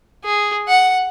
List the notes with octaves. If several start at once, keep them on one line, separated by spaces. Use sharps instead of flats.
G#4
F#5